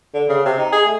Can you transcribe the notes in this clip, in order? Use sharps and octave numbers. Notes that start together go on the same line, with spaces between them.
D3
C#3
C3
D#4
G#4
A3